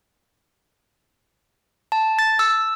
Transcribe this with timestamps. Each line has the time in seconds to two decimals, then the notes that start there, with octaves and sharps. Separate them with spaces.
1.92 A5
2.19 A6
2.39 E6